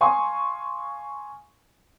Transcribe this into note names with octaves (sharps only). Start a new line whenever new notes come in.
F5 G#5 C6 C#6 D#6